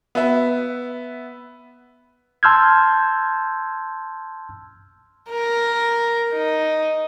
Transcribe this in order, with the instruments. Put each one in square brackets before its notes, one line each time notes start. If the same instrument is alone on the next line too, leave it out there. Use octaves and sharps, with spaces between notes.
[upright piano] B3 E5
[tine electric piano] A5 C6 E6 F6 G6 G#6
[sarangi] A#4
D#4